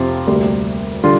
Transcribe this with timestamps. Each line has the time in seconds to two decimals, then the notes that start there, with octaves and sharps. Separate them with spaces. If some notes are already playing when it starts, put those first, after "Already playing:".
Already playing: F2 C3 C4 F4
0.27 D2 C3 G3 A#3
1.03 D3 G3 D4 F4